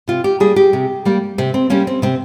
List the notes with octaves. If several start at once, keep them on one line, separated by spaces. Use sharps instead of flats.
C3 F4
G4
G3 A#3 G#4
G4
C3
G3 A#3
C3 C4
C4
G3 A#3 C#4
C4
C3 C4